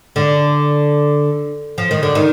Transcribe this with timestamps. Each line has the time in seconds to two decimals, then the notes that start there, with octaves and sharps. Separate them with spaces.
0.16 D3
1.78 F3
1.91 D#3
2.03 D3
2.15 D#3